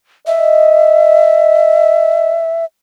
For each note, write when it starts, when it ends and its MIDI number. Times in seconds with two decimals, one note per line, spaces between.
0.27 2.40 75
0.27 2.65 76